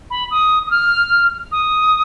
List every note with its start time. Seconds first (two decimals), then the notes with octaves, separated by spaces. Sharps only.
0.10 B5
0.30 D#6
0.66 D#6
0.70 F6
1.51 D#6